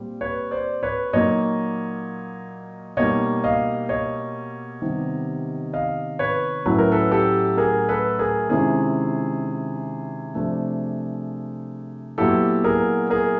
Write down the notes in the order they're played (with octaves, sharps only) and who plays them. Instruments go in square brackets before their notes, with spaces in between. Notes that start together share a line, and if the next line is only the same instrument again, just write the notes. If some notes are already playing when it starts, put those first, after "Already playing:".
Already playing: [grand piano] A#2 G3 C4
B4 C#5
C5 D5
B4 C#5
A#2 F#3 A#3 D#4 C#5 D#5
B2 G3 A#3 D#4 C#5 D#5
D#5 F5
C#5 D#5
C3 D#3 G3 B3
D#5 F5
B4 C#5
A2 F#3 A3 C#4 E4 B4
A#4
A4 B4
G4 A4
G#4 A#4
A4 B4
G#4 A#4
C3 D#3 G#3 C#4 E4 G#4
C3 F3 A3 D4
A#2 F#3 B3 E4 G4 A4
G#4 A#4
G#4 A#4